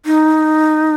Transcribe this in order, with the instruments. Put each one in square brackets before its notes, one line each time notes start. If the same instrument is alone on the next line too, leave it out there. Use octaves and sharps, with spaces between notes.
[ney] D#4